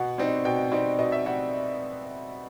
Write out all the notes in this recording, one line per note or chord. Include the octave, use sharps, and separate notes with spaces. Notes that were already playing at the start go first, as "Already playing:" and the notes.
Already playing: B2 F#5
G3 C4 D#4
B2 G5
G3 C4 D#4
B2 D#5
E5
G3 F#5